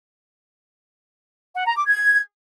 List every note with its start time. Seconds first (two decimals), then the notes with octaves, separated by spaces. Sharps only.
1.55 F#5
1.65 A#5
1.75 D6
1.86 G#6